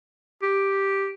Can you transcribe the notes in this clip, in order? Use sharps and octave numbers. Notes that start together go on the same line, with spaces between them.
G4